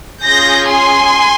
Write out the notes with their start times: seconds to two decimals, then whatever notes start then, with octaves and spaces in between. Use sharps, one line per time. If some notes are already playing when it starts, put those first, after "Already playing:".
0.24 C#4 F4 G#4 G6 A#6
0.67 G#5 C6